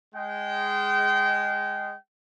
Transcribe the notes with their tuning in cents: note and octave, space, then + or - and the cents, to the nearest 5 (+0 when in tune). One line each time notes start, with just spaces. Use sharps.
G#3 -5 G5 -30